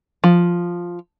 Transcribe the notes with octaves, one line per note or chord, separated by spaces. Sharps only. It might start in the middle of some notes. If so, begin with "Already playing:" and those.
F3